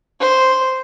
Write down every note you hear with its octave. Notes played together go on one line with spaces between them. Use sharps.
C5